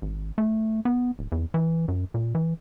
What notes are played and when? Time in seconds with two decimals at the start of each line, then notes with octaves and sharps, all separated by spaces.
0.02 G#1
0.38 A3
0.85 B3
1.19 D1
1.32 E2
1.54 E3
1.88 F#2
2.14 A#2
2.35 E3